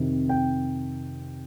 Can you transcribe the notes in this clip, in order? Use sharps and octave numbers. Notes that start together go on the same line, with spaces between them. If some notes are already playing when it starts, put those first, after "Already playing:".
Already playing: F2 C3 D#3
G5